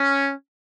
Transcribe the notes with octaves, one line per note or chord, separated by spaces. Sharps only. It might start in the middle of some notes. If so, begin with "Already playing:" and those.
Already playing: C#4